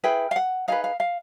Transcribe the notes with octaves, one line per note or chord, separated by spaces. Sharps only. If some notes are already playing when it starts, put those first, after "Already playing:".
E4 G#4 B4 G5
F5
F#5
D#4 G#4 B4 F5
F5
F5